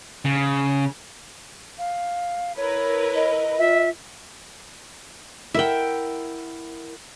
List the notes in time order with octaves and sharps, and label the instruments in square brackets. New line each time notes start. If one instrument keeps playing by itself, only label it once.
[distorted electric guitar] C#3
[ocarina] F5
[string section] E4 A#4 B4 [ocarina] C#5
[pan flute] D#5
[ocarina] F4 [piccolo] E5
[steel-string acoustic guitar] E4 A#4 F#5 [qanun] E5 G5